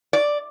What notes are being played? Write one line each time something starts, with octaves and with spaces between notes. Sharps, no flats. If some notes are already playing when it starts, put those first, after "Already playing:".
D5